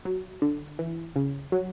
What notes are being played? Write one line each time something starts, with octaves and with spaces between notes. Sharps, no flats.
F#3
D3
E3
C#3
F#3